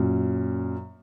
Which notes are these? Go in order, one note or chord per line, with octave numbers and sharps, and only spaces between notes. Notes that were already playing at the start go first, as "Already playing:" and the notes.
Already playing: F#2 A#2